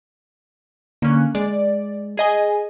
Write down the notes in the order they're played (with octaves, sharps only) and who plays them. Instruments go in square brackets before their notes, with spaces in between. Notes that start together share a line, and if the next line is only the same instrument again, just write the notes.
[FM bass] D3 [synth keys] A#3 C#4 F#6
[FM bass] G#3 [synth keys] D5
[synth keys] G#4 D#5 G#5